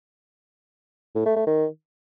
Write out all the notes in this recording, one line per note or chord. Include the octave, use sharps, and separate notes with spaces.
A2
A3
A3
D#3